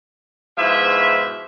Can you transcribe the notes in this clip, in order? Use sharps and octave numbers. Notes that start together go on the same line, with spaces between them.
G#2 B2 F3 E4 E5